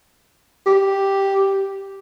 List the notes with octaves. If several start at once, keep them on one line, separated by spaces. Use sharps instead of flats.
G4